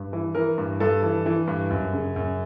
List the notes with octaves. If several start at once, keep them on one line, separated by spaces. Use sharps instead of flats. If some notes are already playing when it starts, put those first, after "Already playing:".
Already playing: G2
E3
E3 A#4
G2
G2 A4
E3
E3
G2
F#2
C#3
F#2